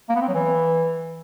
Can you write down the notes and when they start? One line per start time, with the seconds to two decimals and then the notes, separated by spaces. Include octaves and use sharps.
0.09 A#3
0.15 B3
0.22 C4
0.28 F#3
0.34 E3